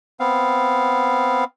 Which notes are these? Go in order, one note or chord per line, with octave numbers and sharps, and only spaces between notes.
B3 C4 F5